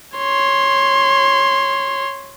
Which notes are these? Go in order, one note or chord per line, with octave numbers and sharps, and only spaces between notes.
C#5 C6